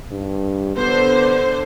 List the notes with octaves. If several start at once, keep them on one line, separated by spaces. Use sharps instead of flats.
G2
D3 B3 C5